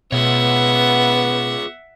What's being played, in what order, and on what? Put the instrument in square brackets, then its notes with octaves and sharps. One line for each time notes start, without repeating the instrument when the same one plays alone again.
[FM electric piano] B2 [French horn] B3 [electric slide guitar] F4 G#4 C#5 [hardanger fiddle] E5 F#5